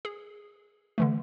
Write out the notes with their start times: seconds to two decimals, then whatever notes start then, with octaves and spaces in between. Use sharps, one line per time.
0.05 G#4
0.98 D3 E3 A3